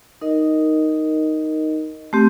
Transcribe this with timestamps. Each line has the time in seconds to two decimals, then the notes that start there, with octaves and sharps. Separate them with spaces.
0.21 D#4 A#4 D#5
2.13 A3 C4 G4